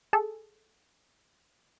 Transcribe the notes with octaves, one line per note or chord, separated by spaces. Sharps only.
G#4 A4